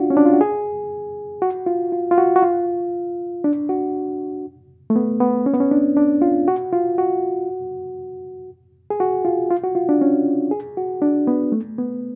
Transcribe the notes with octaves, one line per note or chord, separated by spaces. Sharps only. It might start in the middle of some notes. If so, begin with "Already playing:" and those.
Already playing: D4 F4 F#4
C#4
D4
F4
F#4
G#4
F#4
F4
F4
F4
F#4
F#4
F4
D4
F#4
A3
B3
B3
C#4
B3
C#4
D4
D4
F4
F#4
F4
F#4
G#4
F#4
F4
F4
F#4
F4
D4
C#4
G#4
F#4
D4
B3
A3
B3